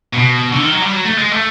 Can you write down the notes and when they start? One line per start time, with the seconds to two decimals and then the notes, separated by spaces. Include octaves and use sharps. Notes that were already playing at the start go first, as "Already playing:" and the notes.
0.13 B2
0.53 D3
0.62 D#3
0.72 F#3
0.82 G3
0.92 F#3
1.05 A3
1.18 G#3
1.31 A3